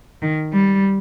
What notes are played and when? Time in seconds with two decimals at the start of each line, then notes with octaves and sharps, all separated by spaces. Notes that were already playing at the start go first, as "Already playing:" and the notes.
0.22 D#3
0.53 G3